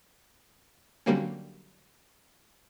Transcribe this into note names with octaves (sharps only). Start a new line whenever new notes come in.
D3 F#3 G3 A#3 C4 C#4